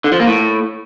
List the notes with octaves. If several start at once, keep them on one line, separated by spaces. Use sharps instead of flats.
D3
F3
A#3
A2